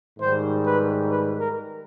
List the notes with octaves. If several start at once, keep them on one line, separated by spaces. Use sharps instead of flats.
G#2 D#3 G3 C5
B4
B4
A#4